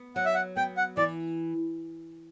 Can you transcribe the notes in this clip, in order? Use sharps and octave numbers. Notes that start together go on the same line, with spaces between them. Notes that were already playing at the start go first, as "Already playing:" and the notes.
Already playing: B3
F#3 F#5
E5
F#5
B3 G5
F#5
E3 D5